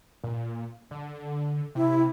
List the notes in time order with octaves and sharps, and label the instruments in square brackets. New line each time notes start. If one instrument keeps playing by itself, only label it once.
[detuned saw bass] A#2
D3
[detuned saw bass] C3 [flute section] E4